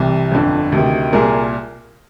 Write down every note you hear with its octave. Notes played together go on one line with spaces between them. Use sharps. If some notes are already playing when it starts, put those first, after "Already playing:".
Already playing: C2 C3 E3
G1 F2 D3
D2 C3 D#3
C2 A#2 G#4 A#4